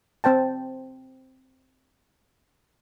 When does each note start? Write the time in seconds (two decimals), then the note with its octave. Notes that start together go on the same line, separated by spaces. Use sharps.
0.24 C4 C5 G5 A5